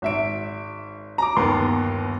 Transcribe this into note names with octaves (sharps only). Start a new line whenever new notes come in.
G#1 E5 D7
A#5 D6
G1 D#2 B3 A#4 C6